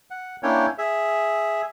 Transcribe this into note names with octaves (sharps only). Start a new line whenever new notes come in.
F#5
A#3 C#4 D4 E4 C#5 G5
G#4 E5